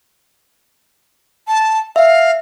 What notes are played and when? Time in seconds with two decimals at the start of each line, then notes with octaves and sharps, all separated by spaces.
1.48 A5
1.96 E5 F5